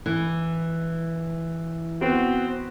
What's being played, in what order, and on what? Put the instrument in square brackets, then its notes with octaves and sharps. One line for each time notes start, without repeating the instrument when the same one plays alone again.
[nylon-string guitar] E3
[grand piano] B3 F#4 [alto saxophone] C4